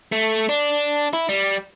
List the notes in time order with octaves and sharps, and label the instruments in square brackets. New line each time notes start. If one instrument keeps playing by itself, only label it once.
[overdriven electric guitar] A3
D4
E4
G3